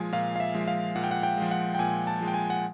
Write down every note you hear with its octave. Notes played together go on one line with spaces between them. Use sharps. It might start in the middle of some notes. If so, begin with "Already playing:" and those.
Already playing: A#2 F3 G#3 G#5
A#2 F5
F5
E5
F3 G#3
F5
A#2 F#5
G5
F#5
G5
F3 G#3
F#5
G5
A#2 G#5
A5
F3 G#3
G5
G#5
F#5